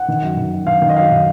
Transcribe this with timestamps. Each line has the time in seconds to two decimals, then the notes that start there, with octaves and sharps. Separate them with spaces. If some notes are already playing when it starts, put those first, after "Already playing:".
Already playing: F#5
0.08 D#3
0.22 F#2
0.37 D#3
0.52 F#2
0.67 D#3 F5
0.82 D#3
0.90 D#5
0.96 F#2 F5
1.11 D#3